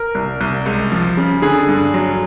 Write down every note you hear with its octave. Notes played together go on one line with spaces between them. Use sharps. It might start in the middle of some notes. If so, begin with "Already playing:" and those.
Already playing: A#4
C2
C2
C#2
F3
C#3
D3 G#4
G2
F#3